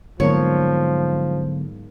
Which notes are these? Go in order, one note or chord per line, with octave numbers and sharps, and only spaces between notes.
G#2 D3 F3 F#3 A#3 B3 C#5